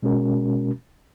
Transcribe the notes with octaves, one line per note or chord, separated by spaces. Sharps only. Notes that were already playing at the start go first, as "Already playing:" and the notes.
B2 G#3 C#4 F#4 A#4